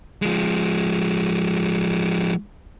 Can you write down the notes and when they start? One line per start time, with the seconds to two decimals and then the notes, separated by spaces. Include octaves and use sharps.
0.22 F3 G#3